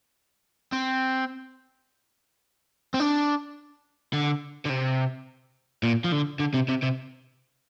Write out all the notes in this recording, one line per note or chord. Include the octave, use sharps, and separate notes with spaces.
C4
C4
D4
D3
D3
C3
A#2
F3
D3
D3
C3
C3
C3